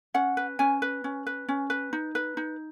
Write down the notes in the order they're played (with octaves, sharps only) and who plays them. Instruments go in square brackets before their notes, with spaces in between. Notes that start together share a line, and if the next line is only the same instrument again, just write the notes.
[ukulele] C#4 F#5
B4
C#4 G#5
B4
C#4
B4
C#4
B4
D#4
B4
D#4